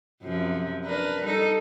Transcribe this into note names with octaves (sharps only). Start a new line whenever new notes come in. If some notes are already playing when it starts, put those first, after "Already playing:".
F#2 C3 F3
D4 A#4 B4
G3 D#4 A4